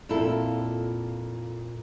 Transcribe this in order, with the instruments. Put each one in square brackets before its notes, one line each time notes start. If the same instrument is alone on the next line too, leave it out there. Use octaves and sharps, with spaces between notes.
[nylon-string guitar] F2 A#2 E4 F4 A4